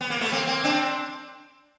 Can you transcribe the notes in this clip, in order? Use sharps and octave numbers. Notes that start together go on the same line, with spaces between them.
B3
A#3
A3 B3
A#3 C4
A#3 C4
C4 D4